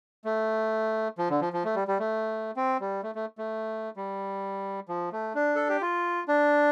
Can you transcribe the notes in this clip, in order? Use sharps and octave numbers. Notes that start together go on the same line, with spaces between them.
A3
F3
D3
F3
F3
A3
G3
G3
A3
C4
G3
A3
A3
A3
G3
F3
A3
D4
A4
G4
F4
D4